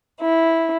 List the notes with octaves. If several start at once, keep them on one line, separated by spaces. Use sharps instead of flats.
E4